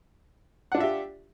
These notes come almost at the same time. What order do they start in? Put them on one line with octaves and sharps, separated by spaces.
F#5 D4 F4 E5 G4